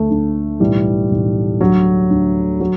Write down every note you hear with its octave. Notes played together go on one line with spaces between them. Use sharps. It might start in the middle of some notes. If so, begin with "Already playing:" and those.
Already playing: D2 D3 A3
D2 D3
B1 A2 E3 G3
B1 A2 E3
D2 D3 F#3
D2 D3
F#3